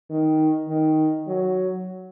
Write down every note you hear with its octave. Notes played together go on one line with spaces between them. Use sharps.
D#3
D#3
F#3